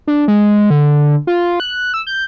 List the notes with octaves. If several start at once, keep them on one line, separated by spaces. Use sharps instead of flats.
D4
G#3
D3
F4
F#6
E6
G6